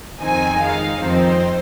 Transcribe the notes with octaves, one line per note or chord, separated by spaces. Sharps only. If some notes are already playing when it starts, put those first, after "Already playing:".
F2 D#3 C4 D#4 G#5
D#3 G#3 D#4 F5
F2 D#3 C4 D#4 C5